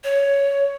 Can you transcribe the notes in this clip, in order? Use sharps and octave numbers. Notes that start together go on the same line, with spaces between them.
C#5